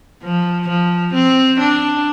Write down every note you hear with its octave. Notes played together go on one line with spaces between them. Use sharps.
F3
F3
C4
D4